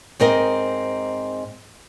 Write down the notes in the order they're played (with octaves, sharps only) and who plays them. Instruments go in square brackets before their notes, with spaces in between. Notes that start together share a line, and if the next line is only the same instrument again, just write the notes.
[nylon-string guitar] G#2 C4 A#4 D#5